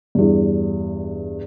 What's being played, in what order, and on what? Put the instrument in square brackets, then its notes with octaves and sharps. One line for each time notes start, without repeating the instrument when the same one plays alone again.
[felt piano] E2 G2